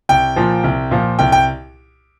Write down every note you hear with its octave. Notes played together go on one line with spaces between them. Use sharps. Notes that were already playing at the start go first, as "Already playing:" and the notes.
C2 G5
A#2 F3
C2
A#2 F3
C2 G5
G5